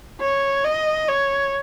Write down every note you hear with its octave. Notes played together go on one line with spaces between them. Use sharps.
C#5
D#5
C#5